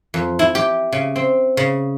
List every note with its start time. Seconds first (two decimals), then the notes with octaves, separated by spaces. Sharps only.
0.14 F2
0.39 E4
0.55 G4
0.92 C#3
1.16 C4
1.57 C#3